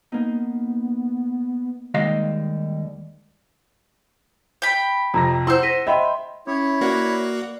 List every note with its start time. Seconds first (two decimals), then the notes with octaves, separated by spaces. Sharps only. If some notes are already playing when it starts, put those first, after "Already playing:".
0.12 A#3 B3 D#4
1.94 D#2 D#3 G3 G#3 D#5 F5
4.62 G5 B5
5.14 F2 C3 A#5 A#6
5.47 E4 C5 F#5 C6 E6
5.63 A#6 B6 D#7
5.87 D#5 E5 G5 B5 C6
6.47 C#4 E4 C#5
6.81 A#3 F#4 B4 D5 F#6